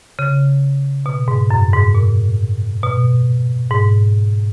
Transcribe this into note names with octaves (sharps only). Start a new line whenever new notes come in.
C#3
B2
G#2
F#2
G#2
A#2
B2
G#2